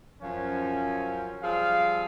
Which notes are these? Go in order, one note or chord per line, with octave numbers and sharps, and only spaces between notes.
F#2 F3 C#4
F3 G3 C4 G#4 F5